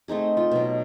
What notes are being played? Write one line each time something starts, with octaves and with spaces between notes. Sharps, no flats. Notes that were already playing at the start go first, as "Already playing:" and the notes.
A3 C4 D#4 G#4
F4
B2 F#3